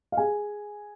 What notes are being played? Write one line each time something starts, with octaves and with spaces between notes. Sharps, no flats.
F5
G#4 G#5